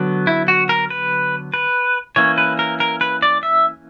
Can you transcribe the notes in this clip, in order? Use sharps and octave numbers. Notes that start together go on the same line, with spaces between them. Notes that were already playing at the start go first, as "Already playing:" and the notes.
Already playing: D3 F#3 B3
E4
F#4
A#4
B4
B4
E3 A#3 C#4 C#5
B4
A#4
A#4
B4
D5
E5